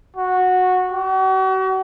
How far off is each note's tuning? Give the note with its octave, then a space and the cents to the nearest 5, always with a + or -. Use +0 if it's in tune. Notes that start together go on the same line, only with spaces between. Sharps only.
F#4 -10
F#4 +40